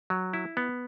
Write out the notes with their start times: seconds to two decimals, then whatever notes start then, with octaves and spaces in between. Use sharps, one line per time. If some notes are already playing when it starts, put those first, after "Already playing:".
0.10 F#3
0.33 E4
0.57 B3